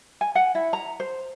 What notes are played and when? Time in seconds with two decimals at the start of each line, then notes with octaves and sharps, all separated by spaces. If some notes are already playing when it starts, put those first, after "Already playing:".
0.21 G#5
0.35 F#5
0.55 E4
0.73 A#5
1.00 C5